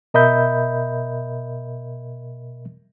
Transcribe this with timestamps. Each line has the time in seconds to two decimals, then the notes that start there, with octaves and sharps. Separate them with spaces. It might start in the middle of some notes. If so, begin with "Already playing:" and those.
0.14 B2 A#4 D#5 E5 B5 G6